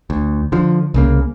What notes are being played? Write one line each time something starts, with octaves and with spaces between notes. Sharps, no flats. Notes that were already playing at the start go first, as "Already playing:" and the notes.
D2
D3 F3
C2 C#3 A#3